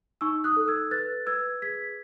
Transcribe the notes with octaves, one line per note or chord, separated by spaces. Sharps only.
D#4 C#6 E6
D#6 F#6
A4
E6 G#6
B4 F#6 A6
B4 E6 G#6
G#4 G#6 B6